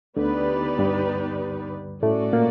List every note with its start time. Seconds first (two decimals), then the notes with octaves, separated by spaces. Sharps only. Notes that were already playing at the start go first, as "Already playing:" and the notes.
0.17 D2 D3 B3 D#4 G4 B4 D5
0.79 G2 G3
2.02 A2 A3 C#4 F#4 A4 D5
2.33 A#2 A#3